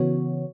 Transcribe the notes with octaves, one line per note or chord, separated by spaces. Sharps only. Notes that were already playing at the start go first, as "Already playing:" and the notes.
Already playing: C#3 E3 B3 F#4 C#5